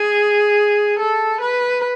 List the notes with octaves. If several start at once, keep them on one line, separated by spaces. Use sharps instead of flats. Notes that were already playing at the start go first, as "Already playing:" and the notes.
Already playing: G#4
A4
B4